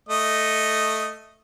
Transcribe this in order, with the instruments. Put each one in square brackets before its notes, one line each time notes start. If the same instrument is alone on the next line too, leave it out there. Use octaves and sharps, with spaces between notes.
[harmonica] A3 D#5